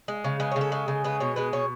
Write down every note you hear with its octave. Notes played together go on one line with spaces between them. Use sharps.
G#3
C#3
G#3 B4
C#5
C#3
A4
G#3
C#3
G#3 B4
B2 C#5
G#3 B4
B2 C#5